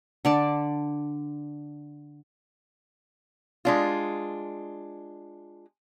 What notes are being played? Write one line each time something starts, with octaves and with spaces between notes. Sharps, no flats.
D3 D5 A5
G#3 D4 F4